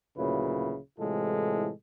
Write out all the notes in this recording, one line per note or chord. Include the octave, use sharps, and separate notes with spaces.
D2 A#2 C#3 F#3 E4 B4
A2 C3 E3 G#3 F4 A4